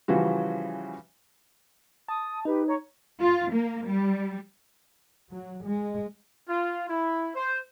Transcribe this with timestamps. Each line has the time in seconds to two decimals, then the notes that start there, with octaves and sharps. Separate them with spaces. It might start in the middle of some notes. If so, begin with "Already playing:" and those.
0.08 C#3 E3 F3 G3 F#4
2.08 A5 D#6
2.45 D#4 G4 B4
2.67 C#5 A#5 C#6
3.21 F4
3.51 A#3
3.86 G3
5.30 F#3
5.64 G#3
6.49 F4
6.89 E4
7.35 C5